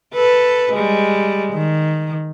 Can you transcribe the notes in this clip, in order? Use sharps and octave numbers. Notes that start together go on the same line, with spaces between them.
A4 B4
G3 G#3
D#3